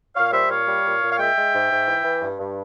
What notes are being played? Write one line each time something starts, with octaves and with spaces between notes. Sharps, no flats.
A#2 C#5 F5
G3 C5 E5
A#2 C#5 F5
G3
A#2
A#2
F5
G#3 E5 G5
G#3
G#2
G#2
E3
E3
G2
G2